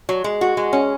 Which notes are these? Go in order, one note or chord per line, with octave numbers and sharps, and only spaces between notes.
F#3
G#3
F#4
G#3
C#4